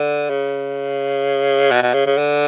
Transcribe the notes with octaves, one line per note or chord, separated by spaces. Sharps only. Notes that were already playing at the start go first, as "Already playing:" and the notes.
Already playing: D3
C#3
B2
B2
C#3
C#3
D3